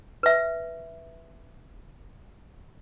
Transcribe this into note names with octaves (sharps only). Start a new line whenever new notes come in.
B4 E5